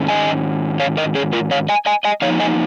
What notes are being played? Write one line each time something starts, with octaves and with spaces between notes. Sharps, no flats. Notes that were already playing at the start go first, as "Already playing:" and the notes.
Already playing: G#2 D#3 G#3 C#4
D#5 G#5
C#5 F5
A#4 D#5
G#4 C#5
F4 A#4
C#5 F5
D#5 G#5
D#5 G#5
D#5 G#5
F2 F3 A#3 D#4 C#5 F5
D#5 G#5